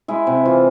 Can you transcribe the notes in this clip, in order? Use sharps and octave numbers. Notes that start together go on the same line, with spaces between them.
G#3 E4
C3
E3 F4